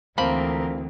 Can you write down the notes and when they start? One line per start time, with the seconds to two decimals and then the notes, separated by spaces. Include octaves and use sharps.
0.18 D2 E3 F3 A#3 C4 A#4 B5